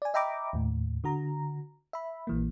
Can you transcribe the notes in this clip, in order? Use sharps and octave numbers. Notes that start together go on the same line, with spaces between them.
D5 G#5
D#5 E5 G5 A#5 B5 D6
D#2 A2
D3 F#4 A#5
E5 B5
A#1 E3 A#3